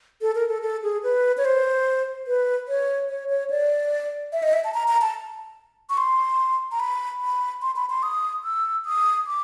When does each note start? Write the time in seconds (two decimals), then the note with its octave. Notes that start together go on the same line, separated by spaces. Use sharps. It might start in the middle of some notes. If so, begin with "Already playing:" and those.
0.22 A4
0.35 A#4
0.49 A4
0.62 A4
0.83 G#4
1.03 B4
1.38 C#5
1.45 C5
2.27 B4
2.68 C#5
3.09 C#5
3.30 C#5
3.50 D5
4.32 E5
4.43 D#5
4.53 E5
4.64 A5
4.74 A#5
4.88 A#5
5.01 A5
5.90 C#6
5.98 C6
6.72 A#5
6.80 B5
7.21 B5
7.62 C6
7.76 B5
7.90 C6
8.03 D#6
8.44 E6
8.86 D#6
9.27 D6